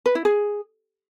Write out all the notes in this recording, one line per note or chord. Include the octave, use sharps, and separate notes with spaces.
B4
E4
G#4